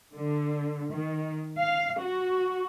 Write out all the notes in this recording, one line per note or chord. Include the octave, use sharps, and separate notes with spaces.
D3
D#3
F5
F#4